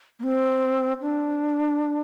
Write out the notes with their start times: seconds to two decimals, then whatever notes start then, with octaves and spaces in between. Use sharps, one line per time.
0.19 A#3
0.23 C4
1.01 D4